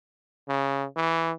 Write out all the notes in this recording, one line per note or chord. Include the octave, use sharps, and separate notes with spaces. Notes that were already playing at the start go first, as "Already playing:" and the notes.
C#3
E3